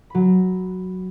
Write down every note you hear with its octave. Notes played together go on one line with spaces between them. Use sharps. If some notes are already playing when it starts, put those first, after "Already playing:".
F#3 B5